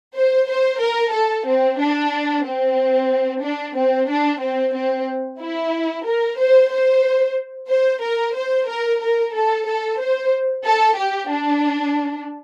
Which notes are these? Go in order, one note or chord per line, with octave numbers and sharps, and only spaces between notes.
C5
C5
A#4
A4
C4
D4
C4
D4
C4
D4
C4
C4
E4
A#4
C5
C5
C5
A#4
C5
A#4
A#4
A4
A4
C5
A4
G4
D4